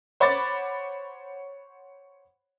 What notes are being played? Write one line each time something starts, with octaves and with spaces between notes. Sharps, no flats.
C5 C#5 F#5 B5 D6 A6